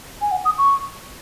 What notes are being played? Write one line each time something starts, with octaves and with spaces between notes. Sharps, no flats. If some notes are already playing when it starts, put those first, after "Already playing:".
G#5
F#5
D#6
C#6